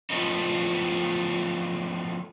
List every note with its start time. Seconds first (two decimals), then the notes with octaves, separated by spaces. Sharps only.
0.10 F3 A3 B3 D#4